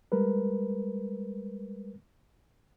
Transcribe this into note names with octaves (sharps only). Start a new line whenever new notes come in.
G3 G#3 A#4 B4